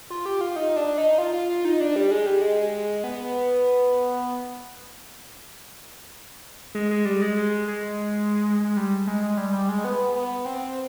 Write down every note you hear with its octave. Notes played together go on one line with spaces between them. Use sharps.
F4
G4
F4
D#4
D4
D#4
F4
F4
F4
D#4
D4
G3
G#3
G3
G#3
B3
G#3
G#3
G3
G#3
G#3
G#3
G#3
G3
G#3
G#3
G3
G3
G#3
B3
B3
C4